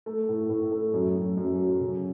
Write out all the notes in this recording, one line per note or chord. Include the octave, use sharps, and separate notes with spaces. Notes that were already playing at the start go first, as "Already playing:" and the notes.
A3
A2
A2
A3
F#2
F#2
F#2
F#3
C#3